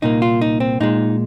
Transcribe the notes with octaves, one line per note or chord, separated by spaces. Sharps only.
C2 A#2 A#3 D#4
F4
D#4
C4
A#2 G#3 D#4